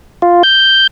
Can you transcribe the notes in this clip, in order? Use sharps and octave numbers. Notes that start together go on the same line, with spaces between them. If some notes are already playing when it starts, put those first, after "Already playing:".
F4
G6